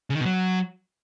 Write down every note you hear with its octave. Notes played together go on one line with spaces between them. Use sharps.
C#3
D#3
B2
F#3